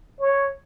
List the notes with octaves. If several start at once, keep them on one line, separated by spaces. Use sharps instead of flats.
C#5